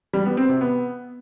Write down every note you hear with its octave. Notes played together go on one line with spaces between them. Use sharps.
G3
B3
C4
C3
B3